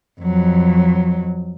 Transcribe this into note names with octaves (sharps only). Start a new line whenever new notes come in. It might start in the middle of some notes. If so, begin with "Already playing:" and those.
F2 F#3